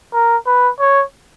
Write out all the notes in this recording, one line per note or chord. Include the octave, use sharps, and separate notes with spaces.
A#4
B4
C#5